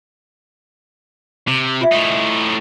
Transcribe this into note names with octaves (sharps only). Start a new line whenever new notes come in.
C3
F4 E5
A2 D#4